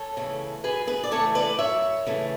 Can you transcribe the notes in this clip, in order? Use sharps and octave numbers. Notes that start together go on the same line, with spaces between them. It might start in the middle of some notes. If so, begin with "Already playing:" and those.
Already playing: A4 C#5
C#3 E3 A3
F#2 G#4 B4
G#4 B4
D5
C#3 E3 A3 A4 C#5
B4 D5
F#2 C#5 E5
C#3 E3 A3